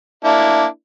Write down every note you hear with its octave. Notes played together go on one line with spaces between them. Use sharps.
A#3 D4 E4